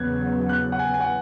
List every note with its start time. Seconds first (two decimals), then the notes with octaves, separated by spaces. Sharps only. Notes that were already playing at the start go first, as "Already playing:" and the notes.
Already playing: E2 C#3 F#3 B3 F#6 G#6
0.49 F#6
0.72 F#5
0.79 G#5
0.94 G#5
1.01 F#5